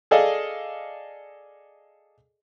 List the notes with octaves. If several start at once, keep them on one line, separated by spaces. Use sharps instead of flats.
G#4 A4 D5 D#5 F5